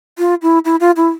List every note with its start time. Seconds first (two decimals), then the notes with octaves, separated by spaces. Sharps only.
0.18 F4
0.42 E4
0.65 E4
0.80 F4
0.97 E4